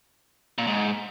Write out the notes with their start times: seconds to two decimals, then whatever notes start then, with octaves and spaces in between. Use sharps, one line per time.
0.58 A#2
0.67 G#2